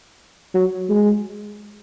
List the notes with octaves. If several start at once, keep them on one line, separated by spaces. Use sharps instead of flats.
F#3
G#3